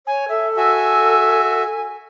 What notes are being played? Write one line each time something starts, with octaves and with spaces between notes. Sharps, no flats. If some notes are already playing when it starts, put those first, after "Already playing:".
C#5 G#5
A4 E5
F#4 E5 G#5